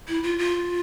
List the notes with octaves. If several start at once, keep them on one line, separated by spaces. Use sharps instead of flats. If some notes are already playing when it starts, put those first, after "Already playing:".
E4
F4
F4